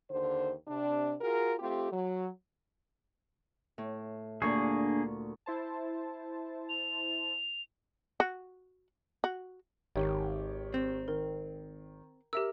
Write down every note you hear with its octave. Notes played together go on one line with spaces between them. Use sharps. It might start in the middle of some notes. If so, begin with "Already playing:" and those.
D#2 D3 C5
C3 D4
F4 F#4 G#4 A#4
A3 C4 F4 G4
F#3
A2
D2 A#2 A#3 D4 G#4 C#6
E4 C5 A5
F7
F#4
F#4
G#1 D#3 G4 C#5
C4
D#3 A#4
G4 A#4 E5 E6